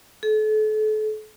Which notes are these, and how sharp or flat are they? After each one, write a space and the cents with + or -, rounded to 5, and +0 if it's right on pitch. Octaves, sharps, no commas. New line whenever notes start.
A4 -35